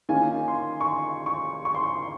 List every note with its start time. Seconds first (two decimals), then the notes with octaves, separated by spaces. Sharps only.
0.09 D#3 A#3 C#4 F4 G#5
0.48 C6
0.81 C#6
0.87 C6
1.26 C#6
1.65 C#6
1.75 C6
1.83 C#6